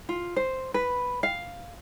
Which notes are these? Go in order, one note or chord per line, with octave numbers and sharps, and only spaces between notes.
F4
C5
B4
F5